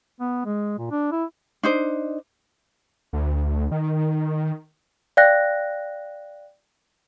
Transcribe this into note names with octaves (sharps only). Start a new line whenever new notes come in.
B3
G#3
A#2
D4
E4
D4 D#4 C5
D2
D#3
D5 F5 G5 F#6 A#6